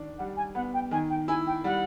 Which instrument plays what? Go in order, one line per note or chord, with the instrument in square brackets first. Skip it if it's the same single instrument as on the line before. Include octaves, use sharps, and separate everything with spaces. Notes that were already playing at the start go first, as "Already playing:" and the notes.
Already playing: [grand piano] D#3 D4
[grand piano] G3 [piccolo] F#5
[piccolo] G#5
[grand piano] B3 [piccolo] F#5
[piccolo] G5
[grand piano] D#3 [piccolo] G#5
[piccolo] G5
[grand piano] E4 [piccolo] G#5
[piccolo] G5
[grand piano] G3 [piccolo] F#5